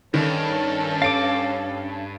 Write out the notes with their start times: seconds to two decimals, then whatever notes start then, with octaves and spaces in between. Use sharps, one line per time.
0.14 G2 D#3 C#4 A4
1.02 F5 D6 A6 D7